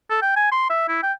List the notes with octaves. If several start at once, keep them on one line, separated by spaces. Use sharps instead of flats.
A4
G5
G#5
C6
E5
E4
G5